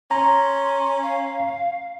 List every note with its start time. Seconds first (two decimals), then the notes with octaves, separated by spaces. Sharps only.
0.11 C#4 A#5 C6
1.03 F5